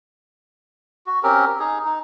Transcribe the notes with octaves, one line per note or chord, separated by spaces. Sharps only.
F#4
C4 C#4 G4 A#4
D#4 G#4
D#4